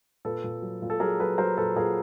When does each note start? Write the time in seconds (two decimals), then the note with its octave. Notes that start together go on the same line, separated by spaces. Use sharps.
0.25 A#2 A4 B4
0.44 A#2
0.62 F#3
0.82 A#2
0.90 A4
1.00 F#3 G#4 A#4
1.20 F#3 A4 B4
1.38 F#3 A#4 C5
1.57 A#2 A4 B4
1.76 A#2 G#4 A#4